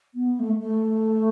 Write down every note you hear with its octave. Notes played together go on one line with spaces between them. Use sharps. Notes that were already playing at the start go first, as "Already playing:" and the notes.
B3
A3
A3